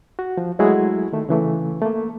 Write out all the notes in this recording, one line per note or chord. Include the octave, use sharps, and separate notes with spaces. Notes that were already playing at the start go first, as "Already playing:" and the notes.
F#4
F3
F#3 G#3 A3 E4 F#4 G#4
D#3 A3
C#3 E3 A3
A3 A#3